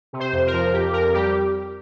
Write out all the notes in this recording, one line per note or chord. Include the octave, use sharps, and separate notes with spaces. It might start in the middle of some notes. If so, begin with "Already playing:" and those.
C3
C5
F2
A#4
F3
F2 G4
F2 A#4
G3 G4